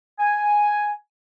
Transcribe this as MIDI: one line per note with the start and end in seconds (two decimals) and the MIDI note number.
0.20 0.92 80